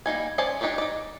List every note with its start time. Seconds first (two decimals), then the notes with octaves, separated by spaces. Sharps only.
0.06 G3 A#3 D#4 G#5
0.38 C#4 C5 D5 G#5 A5
0.61 D4 D#4 G4 C#5 D5
0.78 D#4 D5